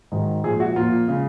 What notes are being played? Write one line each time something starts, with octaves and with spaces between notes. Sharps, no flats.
G#2 D#3 F#3
A#2 F3 G#3 G#4
F#4
A#2 F3 A#3 F4
C#3 G#3